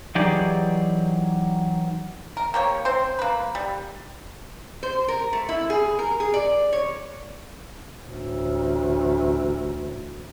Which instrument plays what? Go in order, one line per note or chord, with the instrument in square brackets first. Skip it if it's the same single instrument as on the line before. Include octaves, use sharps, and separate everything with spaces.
[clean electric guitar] E3 F#3 D#4 G4 G#4 D5
[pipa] A#4
A#3 G4 C#5
C4 C5
A#3 B4
G3
[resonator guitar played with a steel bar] C5
A#4
A3
E4
G#4
A#4
G#4
D5
C#5
[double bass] A1 D2